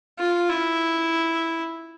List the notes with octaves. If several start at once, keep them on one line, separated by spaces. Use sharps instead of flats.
F4
E4